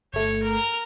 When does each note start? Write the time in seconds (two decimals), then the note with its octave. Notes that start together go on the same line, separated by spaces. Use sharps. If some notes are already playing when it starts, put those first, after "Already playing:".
0.13 G1 A3 C#5
0.43 A#4 A#5